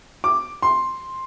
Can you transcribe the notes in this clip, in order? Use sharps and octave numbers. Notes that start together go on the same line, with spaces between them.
D6
C6